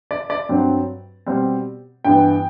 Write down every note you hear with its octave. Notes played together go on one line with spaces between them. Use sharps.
D5
D5
G2 F#3 C4
B2 G3 C4
G2 E3 B3 G5